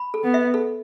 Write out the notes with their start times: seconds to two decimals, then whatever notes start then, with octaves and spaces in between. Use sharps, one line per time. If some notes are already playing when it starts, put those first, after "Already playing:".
Already playing: B5
0.14 A4
0.24 B3
0.34 E5
0.54 A4